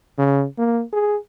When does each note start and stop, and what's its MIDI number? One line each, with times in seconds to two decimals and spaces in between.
0.18 0.45 49
0.59 0.83 58
0.93 1.17 68